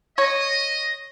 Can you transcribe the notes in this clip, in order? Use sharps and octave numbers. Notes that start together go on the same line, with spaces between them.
C#5 D#5